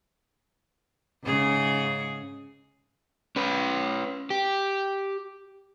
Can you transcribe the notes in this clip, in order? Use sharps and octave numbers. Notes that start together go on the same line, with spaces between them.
G#2 C#3 G#4
C#4 B4
G4